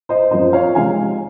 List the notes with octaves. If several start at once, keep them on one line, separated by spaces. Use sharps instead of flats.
C5 D#5
F#2 F3 C4 F4 C5 D#5
C#5 F5
C3 F3 G#3 D#4 F5 G#5